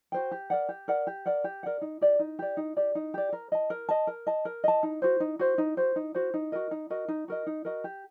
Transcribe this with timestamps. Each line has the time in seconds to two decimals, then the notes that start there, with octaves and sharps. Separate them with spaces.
0.12 F#4 C5 G5
0.31 G4
0.50 A#4 D5 F#5
0.69 G4
0.88 A#4 D5 F#5
1.07 G4
1.26 A#4 D5 F#5
1.44 G4
1.63 A#4 D5 F#5
1.81 D#4
2.01 G4 D5
2.19 D#4
2.39 G4 D5
2.57 D#4
2.77 G4 D5
2.95 D#4
3.14 G4 D5
3.33 A#4
3.52 D#5 A5
3.70 A#4
3.89 D#5 A5
4.07 A#4
4.27 D#5 A5
4.45 A#4
4.64 D#5 A5
4.83 D#4
5.02 F#4 C5
5.20 D#4
5.39 F#4 C5
5.58 D#4
5.77 F#4 C5
5.96 D#4
6.15 F#4 C5
6.34 D#4
6.52 F#4 A#4 D#5
6.71 D#4
6.90 F#4 A#4 D#5
7.08 D#4
7.28 F#4 A#4 D#5
7.47 D#4
7.65 F#4 A#4 D#5
7.84 G4